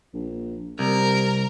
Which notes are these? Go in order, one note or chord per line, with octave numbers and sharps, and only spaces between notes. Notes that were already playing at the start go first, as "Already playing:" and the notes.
A#1
C2 C3 A#4